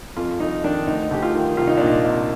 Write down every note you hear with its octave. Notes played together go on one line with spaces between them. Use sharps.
F2 F4
F2 D#4
D#3 D4
D2 D#4
D2 G4
F4
D#3
C2 F4
D#4
A#2 D4
D#4
C2